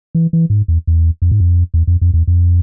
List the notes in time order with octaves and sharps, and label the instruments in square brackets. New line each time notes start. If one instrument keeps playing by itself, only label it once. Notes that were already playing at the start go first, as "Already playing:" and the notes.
[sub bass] E3
E3
G#2
E2
E2
F2
G#2
F2
E2
F2
F2
E2
F2